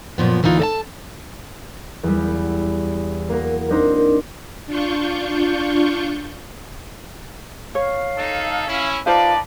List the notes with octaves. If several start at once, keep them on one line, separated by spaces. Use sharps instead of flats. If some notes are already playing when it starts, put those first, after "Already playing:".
F#2 A#2 F3 B3
D2 E3 A#3 D#4 F4
A4 D#5 A5
E2 G3
A#3 F#4 A#4
C4 D4 D#4 A#4 C5
D4 F4 C#6 G6
C#5 F5
D#4 A4
C#4 E4
D#4 F4 B4 C5 D5 F5 A5